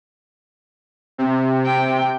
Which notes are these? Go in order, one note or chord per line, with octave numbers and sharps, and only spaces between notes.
C3
G5